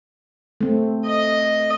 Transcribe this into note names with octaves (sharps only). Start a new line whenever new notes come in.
A3 C4
D#5